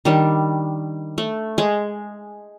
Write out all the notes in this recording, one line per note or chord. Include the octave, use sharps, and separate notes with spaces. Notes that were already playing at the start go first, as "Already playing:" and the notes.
D#3 G3 D4
A3
G#3